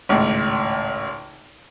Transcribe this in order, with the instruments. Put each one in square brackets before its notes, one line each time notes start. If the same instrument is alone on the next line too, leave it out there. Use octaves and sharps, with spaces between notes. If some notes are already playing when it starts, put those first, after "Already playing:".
[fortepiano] G#1 C#2 A2